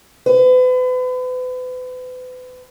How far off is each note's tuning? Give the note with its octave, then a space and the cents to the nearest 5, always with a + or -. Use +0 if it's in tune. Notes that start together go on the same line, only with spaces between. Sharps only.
B4 +40